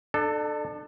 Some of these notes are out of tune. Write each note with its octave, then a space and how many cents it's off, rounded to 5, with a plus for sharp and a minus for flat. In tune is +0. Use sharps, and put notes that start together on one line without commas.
D4 +35 A4 +0